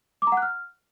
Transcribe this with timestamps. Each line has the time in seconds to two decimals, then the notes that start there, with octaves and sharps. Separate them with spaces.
0.22 D6
0.27 A#5
0.32 F#5
0.37 F#6
0.42 F6